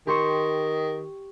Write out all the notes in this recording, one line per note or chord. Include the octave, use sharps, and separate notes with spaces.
D#3 G4 C6 C#6